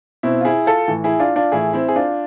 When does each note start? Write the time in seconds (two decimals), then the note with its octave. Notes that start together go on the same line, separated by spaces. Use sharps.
0.23 B2 C4 E4
0.41 F4
0.45 E4 G#4
0.66 F4 A4
0.88 A2 E3
1.04 E4 G#4
1.20 D4 F4
1.36 D4 F4
1.52 A2 E3 E4 G#4
1.73 C4 E4
1.89 G#4
1.96 D4 F4